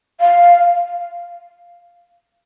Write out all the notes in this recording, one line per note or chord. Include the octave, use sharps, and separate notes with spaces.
F5